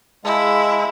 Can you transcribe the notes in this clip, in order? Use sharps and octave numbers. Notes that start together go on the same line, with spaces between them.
G#3 E4 G#4 F5 A5